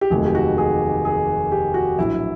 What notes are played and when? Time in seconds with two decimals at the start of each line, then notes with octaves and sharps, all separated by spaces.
0.01 G4
0.10 F1 D#2 D#3 F#3 A3 G#4
0.26 G4
0.35 F#4
0.58 G#4
1.05 G#4
1.52 G4
1.74 F#4
1.98 A#1 A2 F#3 E4